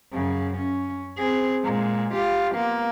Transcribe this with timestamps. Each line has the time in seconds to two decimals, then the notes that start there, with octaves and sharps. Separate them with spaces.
0.13 F#2 C#3
0.57 C#4
1.18 C4 G#4
1.64 A#2 G#3
2.13 F4 G4
2.55 A#3 B3